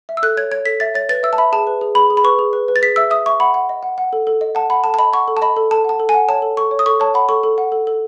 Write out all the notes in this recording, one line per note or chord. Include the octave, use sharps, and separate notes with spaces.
E5
E6
A4 F#6
C#5 G#6
C#5 G#6
A4 B6
E5 A6
C#5 A6
B4 A6
E5 E6
A5
E5 B5
G#4 A5
B4
G#4
G#4 B5
G#4
B5
B4 C#6
G#4
B4
B4
A6
G#4 B6
E5 E6
E5 D#6
E5 C#6
F#5 B5
F#5
D#5
F#5
F#5
A4
A4
D#5
F#5 A5
F#5 B5
A4 A5
A5
D#5 B5
F#5 C#6
A4
A5
D#5 B5
A4
A4 A5
F#5 A5
A4
G#5
F#5
C#5 A5
A4
A4 C#6
C#5
D#6
A4 C#6
C#5 A5
F#5 B5
A4 C#6
A4
F#5
A4
A4